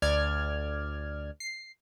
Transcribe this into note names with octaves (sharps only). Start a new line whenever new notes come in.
D2 D5 F6 G#6
C7